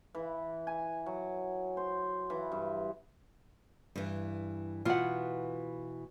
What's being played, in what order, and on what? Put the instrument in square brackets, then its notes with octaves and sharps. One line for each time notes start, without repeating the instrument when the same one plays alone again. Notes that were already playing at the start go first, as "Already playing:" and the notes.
[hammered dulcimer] E3
G#5
F#3
C5
E3
G2
[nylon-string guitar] G2 E3
[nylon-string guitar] B2 E3 B3 [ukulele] F4 F#5